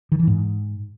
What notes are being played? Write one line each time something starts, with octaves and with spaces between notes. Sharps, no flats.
D#3
E3
G#2